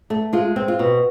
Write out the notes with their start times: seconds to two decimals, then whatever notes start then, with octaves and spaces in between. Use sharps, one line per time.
0.10 A3
0.33 G#3 F4
0.56 C4
0.68 F4
0.79 B2